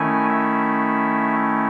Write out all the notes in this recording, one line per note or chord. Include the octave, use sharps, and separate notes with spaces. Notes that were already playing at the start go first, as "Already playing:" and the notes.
Already playing: D#3 A3 C#4 E4 G#5
E5